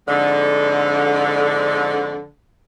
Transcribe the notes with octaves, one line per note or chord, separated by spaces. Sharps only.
F2 G#2 D3